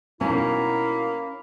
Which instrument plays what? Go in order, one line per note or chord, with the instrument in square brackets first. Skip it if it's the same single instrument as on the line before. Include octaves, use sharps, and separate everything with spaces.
[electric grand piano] B2 D#4 [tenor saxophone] A#3 [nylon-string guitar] C#4 [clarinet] E4